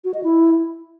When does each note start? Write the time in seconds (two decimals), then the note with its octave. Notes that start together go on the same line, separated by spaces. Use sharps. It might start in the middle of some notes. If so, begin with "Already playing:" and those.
0.04 F#4
0.14 D#5
0.24 E4